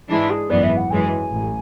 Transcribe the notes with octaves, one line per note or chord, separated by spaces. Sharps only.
G#2 E3 G#3 D4 E4
G#4
G#1 F#2 E3 B3 D5
E5
F#5
F#2 E3 G#3 G#5
A1